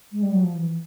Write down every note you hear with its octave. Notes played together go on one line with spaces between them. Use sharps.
G#3
G3
F#3
F3
E3